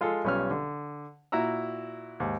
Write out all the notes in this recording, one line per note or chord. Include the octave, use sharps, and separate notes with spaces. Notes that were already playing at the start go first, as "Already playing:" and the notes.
G#3 F4 G#4 A4
B1 G3 C#4 F4 F6
D3
A#2 E4 F#4 A#5 E6
D#2 G#2